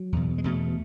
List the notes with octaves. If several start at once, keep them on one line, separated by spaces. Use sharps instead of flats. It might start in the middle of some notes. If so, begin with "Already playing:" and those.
Already playing: F#3
E2 B2
G#3
E2 B2 A3